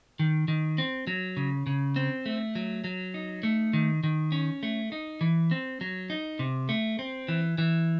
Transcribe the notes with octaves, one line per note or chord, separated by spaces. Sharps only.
D#3
D#3
C4
F#3
C#3
C#3
C4
A3
F#3
F#3
D#4
A3
D#3
D#3
C#4
A3
D#4
E3
C4
F#3
D#4
C3
A3
C4
E3
E3